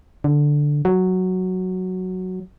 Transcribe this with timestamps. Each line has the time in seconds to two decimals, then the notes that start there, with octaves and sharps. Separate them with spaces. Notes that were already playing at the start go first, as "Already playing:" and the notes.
0.24 D3
0.85 F#3